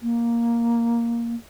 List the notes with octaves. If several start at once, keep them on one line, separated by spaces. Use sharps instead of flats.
A#3